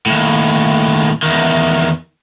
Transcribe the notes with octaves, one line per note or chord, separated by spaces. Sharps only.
D#2 A2
E2 D#3